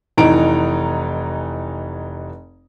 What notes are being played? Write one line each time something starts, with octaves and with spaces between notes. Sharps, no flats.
F1 E3 D#4 A#5 D7